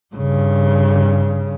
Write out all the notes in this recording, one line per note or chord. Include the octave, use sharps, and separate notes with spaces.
G2 C#3